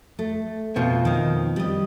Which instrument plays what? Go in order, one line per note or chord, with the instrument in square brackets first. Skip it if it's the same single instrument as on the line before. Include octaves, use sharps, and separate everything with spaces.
[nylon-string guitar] A3
[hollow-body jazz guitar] F2 B2 F3
[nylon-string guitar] D#3 D#4
G3 D#5